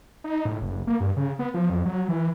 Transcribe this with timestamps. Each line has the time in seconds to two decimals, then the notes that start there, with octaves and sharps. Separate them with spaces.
0.24 D#4
0.45 A2
0.61 F#1
0.87 A#3
1.00 G2
1.17 C#3
1.39 B3
1.54 F3
1.70 F2
1.85 F#3
2.08 E3